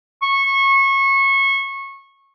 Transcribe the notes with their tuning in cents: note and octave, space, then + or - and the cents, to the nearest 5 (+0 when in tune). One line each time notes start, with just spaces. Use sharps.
C#6 -25